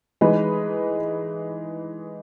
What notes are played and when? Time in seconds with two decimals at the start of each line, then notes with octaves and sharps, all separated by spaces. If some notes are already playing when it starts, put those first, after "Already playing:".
0.21 E3 G#3 D#4 G#4 B4